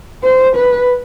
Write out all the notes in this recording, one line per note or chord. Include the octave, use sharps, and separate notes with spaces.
C5
B4